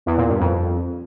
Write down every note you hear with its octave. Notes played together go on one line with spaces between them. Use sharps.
E2
A#2
G2
F2